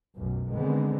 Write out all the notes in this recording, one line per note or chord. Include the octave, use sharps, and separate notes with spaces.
F1 B1 F#2
D3 D#3 G#3 B3 C4